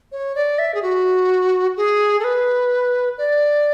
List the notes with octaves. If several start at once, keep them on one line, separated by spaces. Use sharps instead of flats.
C#5
D5
E5
G#4
F#4
G#4
A4
B4
D5